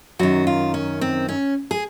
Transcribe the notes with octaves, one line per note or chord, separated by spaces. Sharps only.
F#2 D#3 F#4
F4
C#4
C4
C#4
G#4